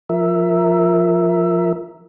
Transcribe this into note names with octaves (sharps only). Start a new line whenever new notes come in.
F3 A#4 E5